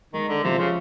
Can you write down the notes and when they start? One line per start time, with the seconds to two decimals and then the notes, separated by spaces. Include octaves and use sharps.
0.14 D#3 G#3
0.29 D3
0.44 C3 F3
0.59 C#3